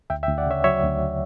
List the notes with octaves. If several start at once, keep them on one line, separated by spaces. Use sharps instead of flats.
D2 E5 G5
E5 G5
D2
D5 F#5
C#3 C#5 E5
F#3 C#5 E5
D2